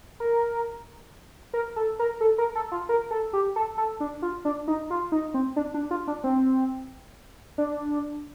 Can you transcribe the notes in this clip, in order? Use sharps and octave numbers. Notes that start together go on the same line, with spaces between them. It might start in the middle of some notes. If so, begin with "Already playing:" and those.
A#4
A#4
A4
A#4
A4
A#4
A4
F4
A#4
A4
G4
A4
A4
D4
F4
D4
D#4
F4
D#4
C4
D4
D4
F4
D4
C4
D4